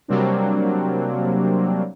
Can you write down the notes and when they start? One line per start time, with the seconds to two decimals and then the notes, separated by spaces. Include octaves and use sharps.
0.08 C3 F#3 G3 A#3 C4 D4